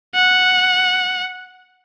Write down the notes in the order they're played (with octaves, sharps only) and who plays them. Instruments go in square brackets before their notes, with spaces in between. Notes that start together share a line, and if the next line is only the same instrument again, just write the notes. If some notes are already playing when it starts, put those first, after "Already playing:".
[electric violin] F#5